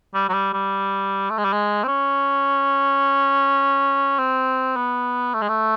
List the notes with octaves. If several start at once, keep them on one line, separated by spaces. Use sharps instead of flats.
G3
F#3
G3
G3
A3
G#3
G3
G#3
C4
C#4
C4
B3
A3
G#3
A3